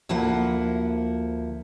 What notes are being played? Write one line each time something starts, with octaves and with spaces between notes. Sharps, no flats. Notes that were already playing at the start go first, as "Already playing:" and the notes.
D2 F3 A#3 E4 F#5